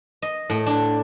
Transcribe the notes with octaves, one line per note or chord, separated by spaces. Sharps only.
D#5
A2
D4